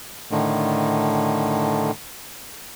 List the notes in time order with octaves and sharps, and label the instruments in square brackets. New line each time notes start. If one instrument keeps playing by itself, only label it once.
[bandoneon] A2 D3 D#3